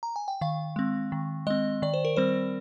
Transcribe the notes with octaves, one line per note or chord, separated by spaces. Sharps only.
A#5
G#5
G5
D#3 F5
G#3 C4
D#3
G#3 C4 D#5
D#3 D5
C5
A#4
G3 C4 C5